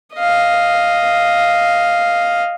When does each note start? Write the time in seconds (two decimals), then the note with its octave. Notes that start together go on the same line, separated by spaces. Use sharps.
0.16 D#5 F5